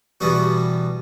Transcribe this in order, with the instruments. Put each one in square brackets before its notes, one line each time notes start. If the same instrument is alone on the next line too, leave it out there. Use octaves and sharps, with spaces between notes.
[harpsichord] E2 B2 G3 B3 F#4